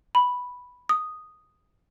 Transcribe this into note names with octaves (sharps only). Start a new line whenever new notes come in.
B5
D#6